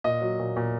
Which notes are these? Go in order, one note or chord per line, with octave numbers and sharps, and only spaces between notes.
A#2 D#5
F#3
A#2
A#2